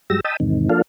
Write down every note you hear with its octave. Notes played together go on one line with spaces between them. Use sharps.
G2 F#3 G#3 G4 E6 A#6
D#5 G5 A5 B5 D#6 E6
E2 G#2 C3 D#3
F3 A#3 D4 F4 A4 F5